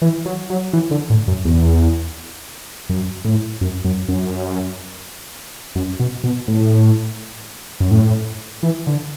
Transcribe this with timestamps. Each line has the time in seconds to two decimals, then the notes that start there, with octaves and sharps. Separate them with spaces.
0.02 E3
0.25 F#3
0.50 F#3
0.73 E3
0.91 D3
1.10 A2
1.28 F#2
1.45 E2
2.89 F#2
3.25 A2
3.61 F#2
3.85 F#2
4.08 F#2
5.75 F#2
6.00 B2
6.24 B2
6.48 A2
7.80 F#2
7.91 A2
8.63 E3
8.87 D3